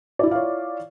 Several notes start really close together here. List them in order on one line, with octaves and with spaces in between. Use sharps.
D5 E4 F4 F5 C#5